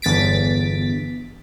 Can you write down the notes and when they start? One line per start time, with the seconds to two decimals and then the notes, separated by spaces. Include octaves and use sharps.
0.02 G1 E2 A6 B6 D7